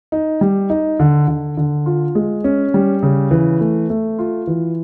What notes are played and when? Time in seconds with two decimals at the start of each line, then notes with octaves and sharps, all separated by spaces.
0.12 D#4
0.41 G3
0.70 D#4
1.00 D3
1.28 D3
1.57 D3
1.86 F4
2.15 G#3
2.44 C#4
2.74 G3
3.03 C#3
3.31 E3
3.61 A3
3.90 A3
4.19 F4
4.47 E3